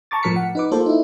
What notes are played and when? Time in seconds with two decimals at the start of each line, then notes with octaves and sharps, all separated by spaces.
0.11 A5 A#5 C#6 D6 A6
0.23 A2 F3 A#4 F6 B6 C#7
0.36 F#5
0.55 D#4 B4 D6
0.71 A#3 F4 A4 A#4 C5
0.86 D#4 E4